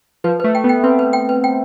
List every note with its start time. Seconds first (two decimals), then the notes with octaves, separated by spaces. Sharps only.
0.24 F3 B4
0.40 A3 B4
0.55 G5
0.64 B3
0.69 G5
0.84 C4 B4
0.99 B4
1.13 G5
1.29 B4
1.44 G5